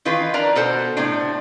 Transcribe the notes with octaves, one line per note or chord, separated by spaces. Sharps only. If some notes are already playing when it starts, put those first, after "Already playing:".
D#3 E3 F4 B4
D4 A#4 D5 A#5
B2 A4 C5
A2 C3 D4